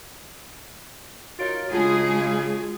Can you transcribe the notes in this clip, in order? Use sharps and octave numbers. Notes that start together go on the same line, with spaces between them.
D#4 F4 F#4 A#4 C#5 A6 D7
C#3 G#3 D4 F4 F#4 G#4 F#5 A5